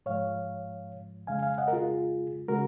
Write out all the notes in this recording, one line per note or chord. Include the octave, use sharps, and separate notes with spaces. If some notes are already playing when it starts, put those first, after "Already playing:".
G#2 F3 G#3 C#5 F5
F2 C#3 G#3 F5 G#5
F5 G#5
D#5 F#5
A#4
F4 G#4
C#3 G#3 F#4 A#4